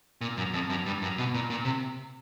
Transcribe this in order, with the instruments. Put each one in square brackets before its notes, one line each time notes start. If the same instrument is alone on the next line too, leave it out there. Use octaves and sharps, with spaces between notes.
[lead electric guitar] A#2
F#2
F2
F#2
G2
F#2
B2
A#2
A#2
C3